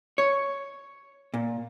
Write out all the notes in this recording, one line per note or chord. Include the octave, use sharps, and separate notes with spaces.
C#5
A#2